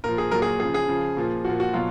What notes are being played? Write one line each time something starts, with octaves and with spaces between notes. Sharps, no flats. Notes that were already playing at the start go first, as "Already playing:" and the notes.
A#2 F3 A#4
G#4
A#2 F#3 A#4
G#4
C#3 F3 G#4
G#4
C#3 F3
A#2 F3
A#2 F3 F#4
F#4
B2 F#3 F4